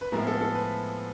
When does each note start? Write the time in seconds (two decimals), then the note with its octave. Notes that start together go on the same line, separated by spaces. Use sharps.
0.01 B4
0.12 A2 F3 G#3 B3 E4 A#4
0.27 A4
0.41 A4
0.55 B4